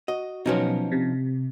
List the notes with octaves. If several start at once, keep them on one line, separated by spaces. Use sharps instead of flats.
F#4 D#5
B2 F3 F#3 B3 C#4 D#4
C3